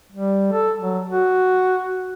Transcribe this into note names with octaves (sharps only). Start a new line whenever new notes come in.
G3
A4
F#3
F#4